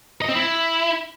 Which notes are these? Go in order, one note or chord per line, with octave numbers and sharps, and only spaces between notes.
D#5
C4
E4